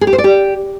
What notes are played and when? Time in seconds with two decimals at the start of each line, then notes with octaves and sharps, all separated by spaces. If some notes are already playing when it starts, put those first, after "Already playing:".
0.01 G#4
0.07 G4
0.13 C5
0.18 D5
0.24 G4